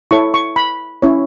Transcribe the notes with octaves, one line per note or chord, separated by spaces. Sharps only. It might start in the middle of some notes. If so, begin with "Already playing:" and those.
E4 A4 C#5 C#6
C#6
B5
C#4 E4 C#5